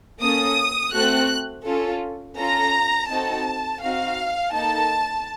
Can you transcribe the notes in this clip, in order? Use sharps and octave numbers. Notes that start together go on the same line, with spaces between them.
A#3 C#4 A4 D#6
A3 C4 F#4 F#6
C#4 F4 A4
C#4 F4 A4 A#5
C4 D#4 F#4 A4 A5
C4 D#4 F#4 F5
A#3 D#4 A4 A5